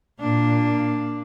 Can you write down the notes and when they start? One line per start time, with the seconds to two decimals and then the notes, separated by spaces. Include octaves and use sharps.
0.20 A#2 A#3 D4